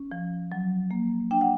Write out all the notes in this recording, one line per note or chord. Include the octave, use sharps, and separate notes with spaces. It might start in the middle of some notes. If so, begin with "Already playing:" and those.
Already playing: C#4
F3
F#3
A#3
D4 G5
F#5